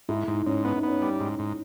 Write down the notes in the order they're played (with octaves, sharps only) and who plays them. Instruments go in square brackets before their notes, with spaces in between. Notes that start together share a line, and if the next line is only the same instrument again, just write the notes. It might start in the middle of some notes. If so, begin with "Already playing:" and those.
[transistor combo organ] G#2 [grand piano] E4
[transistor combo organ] G#2 [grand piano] D#4
[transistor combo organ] G#2 [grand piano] C#4
[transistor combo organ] B3 [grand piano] C#4
[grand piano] D#4
[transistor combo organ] B3 [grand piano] C#4
[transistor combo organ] G3
G#2
G#2